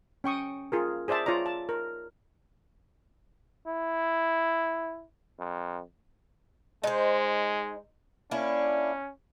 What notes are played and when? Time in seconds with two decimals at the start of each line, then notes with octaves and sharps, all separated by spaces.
0.24 C#4 G5 C#6 D#6
0.72 F4 G#4 A#4
1.08 G#4 C5 D5 E5 A5
1.26 F4 C#5 D5 A#5
1.46 A5
1.69 A#4
3.67 E4
5.39 F2
6.84 G#3 D#4 C5
8.31 A#3 C#4 D4 E4